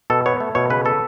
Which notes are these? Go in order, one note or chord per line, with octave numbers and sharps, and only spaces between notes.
B2 A4
B3 C#5
A3
B2 C#5
C#3 B4
B3 A4